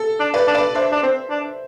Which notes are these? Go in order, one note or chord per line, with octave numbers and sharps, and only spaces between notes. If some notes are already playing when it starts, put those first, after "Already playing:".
Already playing: A4
D4
B4 D5
D4
B4 D5
D4 C5 E5
D4
C4
D4